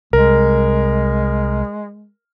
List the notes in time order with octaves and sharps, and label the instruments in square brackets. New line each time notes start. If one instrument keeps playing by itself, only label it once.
[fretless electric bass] C2 [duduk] G#3 [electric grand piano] A#4